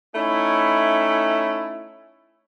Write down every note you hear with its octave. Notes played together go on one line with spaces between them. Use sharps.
A3 C#4 D#4 E4